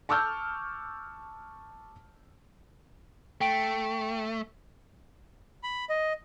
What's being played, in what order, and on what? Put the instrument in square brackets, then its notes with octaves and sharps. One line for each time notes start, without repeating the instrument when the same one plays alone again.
[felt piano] A5 C#6 D6 E6 F6 G6
[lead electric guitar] A3 [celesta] G5 D7
[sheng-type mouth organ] B5
D#5